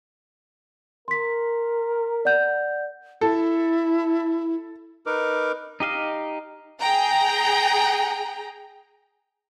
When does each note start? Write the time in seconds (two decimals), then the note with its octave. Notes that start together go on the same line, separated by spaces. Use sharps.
1.08 A#4 C6 B6
2.25 D5 F#5 G6
3.21 E4 A4
5.06 D#4 A#4 B4 D6
5.80 D#4 G4 D#5 F5
6.80 G#4 G5 A#5